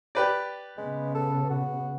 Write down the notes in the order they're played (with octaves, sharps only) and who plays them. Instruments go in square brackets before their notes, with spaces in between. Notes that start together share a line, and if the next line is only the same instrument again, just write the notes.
[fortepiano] G4 B4 D5
[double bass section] C#3 B3 [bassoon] G#3
[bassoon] A4
F#4